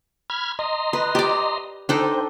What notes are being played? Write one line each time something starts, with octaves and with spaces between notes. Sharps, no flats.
B5 F6 G#6
D#5 A#5 C6
B4
G4 D5
D4 D#4 A4 C5 G5